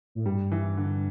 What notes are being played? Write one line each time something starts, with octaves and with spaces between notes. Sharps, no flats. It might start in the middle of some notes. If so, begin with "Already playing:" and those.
A2
G2 G3
E3
D3